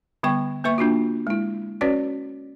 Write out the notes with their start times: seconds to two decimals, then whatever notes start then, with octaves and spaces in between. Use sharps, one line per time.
0.23 D3 G3 B3 G5 C#6
0.64 A#3 B4 E5 C#6
0.78 A#3 D4 F4 F#4
1.27 G#3 E4
1.81 C#4 F#4 B4 C#5 D5